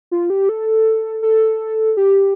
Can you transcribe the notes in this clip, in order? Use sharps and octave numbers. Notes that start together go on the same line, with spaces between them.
F4
G4
A4
A4
G4